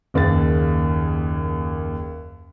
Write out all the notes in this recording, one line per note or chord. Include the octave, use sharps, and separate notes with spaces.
F#1 D#2 G#4 A6